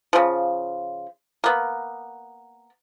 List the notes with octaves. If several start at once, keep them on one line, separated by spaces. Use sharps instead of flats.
C#3 F3
A#3 B3